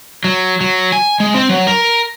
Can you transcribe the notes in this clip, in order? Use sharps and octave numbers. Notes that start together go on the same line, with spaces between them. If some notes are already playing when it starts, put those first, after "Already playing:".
F#3
F#3
G#5
G#3
C4
F#3
A#4